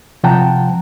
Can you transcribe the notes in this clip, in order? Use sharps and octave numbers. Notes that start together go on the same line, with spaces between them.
C3 F3 F#5 G5 A5 A#5